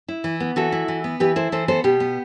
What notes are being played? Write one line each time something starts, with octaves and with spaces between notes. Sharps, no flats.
E4
E3
B3
E3 F#4 A4
E4
E3
B3
E3 G4 B4
E4 A4 C5
E3 A4 C5
B3 A4 C5
B2 G4
B3